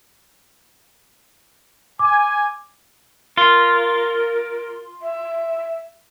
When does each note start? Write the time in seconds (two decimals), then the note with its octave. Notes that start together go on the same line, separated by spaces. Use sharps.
1.99 G#5 D6
3.37 F4 A#4
5.02 E5